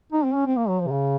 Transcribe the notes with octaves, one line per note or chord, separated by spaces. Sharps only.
D#4
C4
C#4
C4
A#3
F#3
F3
C3
C#3